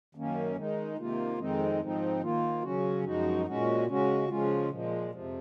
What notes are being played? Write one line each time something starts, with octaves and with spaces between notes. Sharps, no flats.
F#2 D#3 A#3 C#4
D#3 G#3 D#4
C3 D#3 A#3 F4
F2 D#3 G#3 C4 D#4
G#2 F3 C4 D#4
D#3 A#3 F4
C#3 F#3 C#4 F#4
F#2 F3 G#3 D#4 F#4
A#2 G#3 C#4 F#4
C#3 G#3 C#4 F#4
C#3 F3 G#3 C#4 F4
A#2 F3 G#3
F2 C3 F3